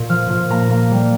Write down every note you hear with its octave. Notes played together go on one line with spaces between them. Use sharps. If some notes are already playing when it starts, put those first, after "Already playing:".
Already playing: A#2
F3 F6
A#2
A#3 A#5
A#3
G3